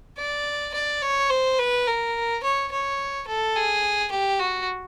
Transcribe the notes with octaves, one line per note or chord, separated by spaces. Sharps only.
D5
D5
C#5
C5
B4
A#4
C#5
C#5
A4
G#4
G4
F#4